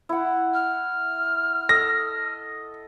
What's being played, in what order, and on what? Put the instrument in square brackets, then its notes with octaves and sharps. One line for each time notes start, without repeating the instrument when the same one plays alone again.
[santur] E4 F#5
[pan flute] F6
[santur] A4 D#5 [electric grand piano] A#6